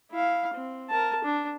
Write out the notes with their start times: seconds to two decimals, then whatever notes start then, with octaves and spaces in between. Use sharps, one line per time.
0.11 E4 F5
0.53 C4
0.90 A#4 A5
1.24 D4